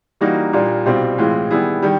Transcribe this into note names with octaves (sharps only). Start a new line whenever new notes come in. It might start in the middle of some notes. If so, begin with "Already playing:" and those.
E3 G3 A#3 D#4 F#4
A#2 G3 A#3 D4 F4
C2 B2 G3 C4 F4
A2 E3 G#3 C4 F4
D#3 G3 B3 E4 G#4
D#3 G3